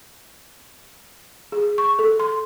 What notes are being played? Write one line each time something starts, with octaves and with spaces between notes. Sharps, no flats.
G#4
C#6
A4
C6